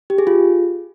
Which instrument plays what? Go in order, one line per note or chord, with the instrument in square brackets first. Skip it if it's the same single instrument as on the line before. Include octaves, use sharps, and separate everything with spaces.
[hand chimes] G4
G#4
F4